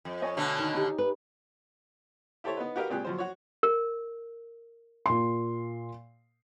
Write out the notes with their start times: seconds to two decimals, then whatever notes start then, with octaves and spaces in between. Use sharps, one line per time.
0.05 F2
0.22 C#5 D#5 G#5
0.37 B2 D3 A3
0.58 D#3
0.74 D#4 G4
0.98 B4
2.44 E4 G4 A4 C5 C#5
2.57 B3 D#4 B4
2.76 F#4 G4 A#4 B4 F5
2.90 C#2 A#2 C4 G4 G#4 F#6
3.05 F#2 F3 C5
3.18 F#4 C#5
3.63 A#4
5.06 A#2 C6